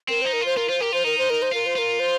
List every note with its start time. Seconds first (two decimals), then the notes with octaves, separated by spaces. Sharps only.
0.08 C4 A#4
0.22 D#4 C5
0.33 A#4
0.41 F4 C5
0.57 F4 A#4
0.69 F4 C5
0.80 G4 A#4
0.93 F4 C5
1.04 D#4 A#4
1.18 C5
1.30 A#4
1.42 C5
1.52 F4 A#4
1.66 C5
1.76 F4 A#4
2.00 C5